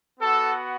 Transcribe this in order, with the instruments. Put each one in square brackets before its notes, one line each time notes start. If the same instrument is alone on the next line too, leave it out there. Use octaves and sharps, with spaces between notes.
[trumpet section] B3 F#4 A4